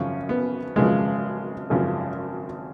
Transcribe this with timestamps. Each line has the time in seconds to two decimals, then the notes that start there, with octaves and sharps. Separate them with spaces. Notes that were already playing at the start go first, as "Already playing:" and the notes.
Already playing: G#1 F#2 C#3 F3 C#4
0.29 B3
0.76 G#1 F#2 C#3 F3 G#3
1.70 G#1 F#2 C#3 F3